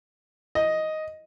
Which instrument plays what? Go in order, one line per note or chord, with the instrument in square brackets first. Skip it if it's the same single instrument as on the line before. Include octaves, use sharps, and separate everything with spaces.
[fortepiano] D#5